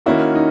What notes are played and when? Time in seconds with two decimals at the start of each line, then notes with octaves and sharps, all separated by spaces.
0.06 D#3 A#3 C#4 E4 F#4 A#4
0.35 D#4